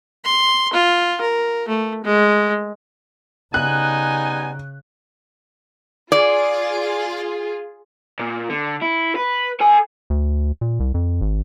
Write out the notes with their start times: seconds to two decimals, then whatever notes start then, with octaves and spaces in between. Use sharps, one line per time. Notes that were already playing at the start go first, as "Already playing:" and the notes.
0.24 C6
0.74 F4
1.21 A#4
1.68 A3
2.04 G#3
3.54 C#3 G3 B3 D#4 G#5 F#6
6.12 F4 G#4 D5
8.19 A#2
8.50 D3
8.82 E4
9.16 B4
9.61 A4 G#5
10.10 D2
10.61 A#2
10.80 C2
10.94 F2
11.21 G#1